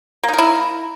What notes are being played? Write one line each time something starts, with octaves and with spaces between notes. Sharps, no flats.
A#3 D#4 E4 A#4